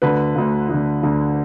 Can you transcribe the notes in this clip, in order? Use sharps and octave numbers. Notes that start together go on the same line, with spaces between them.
D2 D3 B4
D2 D3
D2 D3
D2 D3